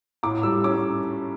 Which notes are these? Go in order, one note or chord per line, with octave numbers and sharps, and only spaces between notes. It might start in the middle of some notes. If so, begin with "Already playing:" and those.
A2 D6
G3 E6
C#4 D6